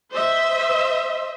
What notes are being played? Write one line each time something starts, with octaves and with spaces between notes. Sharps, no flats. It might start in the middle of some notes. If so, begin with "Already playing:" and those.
C5 D#5 E5